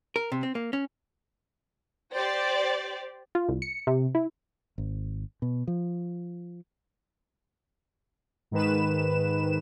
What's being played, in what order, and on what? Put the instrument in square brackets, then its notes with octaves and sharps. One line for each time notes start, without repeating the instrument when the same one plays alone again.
[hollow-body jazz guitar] A#4
C3
C4
A#3
C#4
[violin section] G4 C5 D5
[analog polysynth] F4
C2
C#7
C3
E4
[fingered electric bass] G#1
B2
F3
[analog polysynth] G#2 D#3 B4 E7